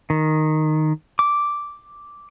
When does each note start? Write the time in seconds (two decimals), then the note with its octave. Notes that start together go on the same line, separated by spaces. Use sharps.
0.10 D#3
1.19 D6